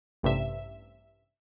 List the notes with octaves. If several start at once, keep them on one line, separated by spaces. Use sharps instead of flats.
A1 G2 C3 E5